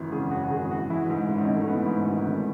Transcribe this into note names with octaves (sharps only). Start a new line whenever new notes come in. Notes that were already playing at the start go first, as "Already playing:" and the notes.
Already playing: G#1 F#2 C#3 E3
C#3 G#4
F#2 F#4
F#4
G#1 G#4
E3 F#4
E3 E4
G#2
G#1
C#4
D#4
G#1
A3
E3 B3
G#2
G#1
G#1